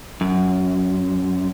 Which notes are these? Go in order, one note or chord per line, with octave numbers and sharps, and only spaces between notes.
F#2